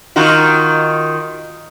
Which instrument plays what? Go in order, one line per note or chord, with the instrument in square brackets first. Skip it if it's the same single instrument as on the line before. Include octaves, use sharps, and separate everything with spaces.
[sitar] D#3 F4 F#4